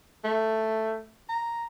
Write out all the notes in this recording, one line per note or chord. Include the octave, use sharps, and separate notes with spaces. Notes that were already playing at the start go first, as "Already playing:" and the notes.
A3
A#5